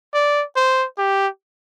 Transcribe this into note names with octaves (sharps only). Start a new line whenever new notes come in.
D5
C5
G4